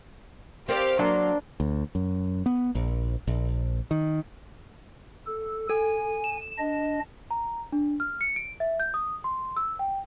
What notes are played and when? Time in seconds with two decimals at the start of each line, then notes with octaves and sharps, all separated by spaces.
0.68 C4 G4 A#4 D5 F5
0.99 F#3 A#3 D4 C6
1.60 D2
1.95 F#2
2.46 B3
2.75 A#1
3.27 A#1
3.91 D#3
5.27 A4
5.69 A4 G#5
6.24 E7
6.58 D4 D#5
7.31 A#5
7.72 D4
8.00 F6
8.21 C#7
8.36 D7
8.60 E5
8.80 G6
8.94 D#6
9.24 C6
9.57 E6
9.79 G5